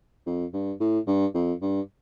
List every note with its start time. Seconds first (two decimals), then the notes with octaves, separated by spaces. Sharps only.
0.26 F2
0.54 G2
0.80 A2
1.07 G2
1.34 F2
1.62 G2